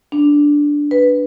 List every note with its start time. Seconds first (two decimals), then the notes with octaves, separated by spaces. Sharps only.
0.12 D4
0.91 B4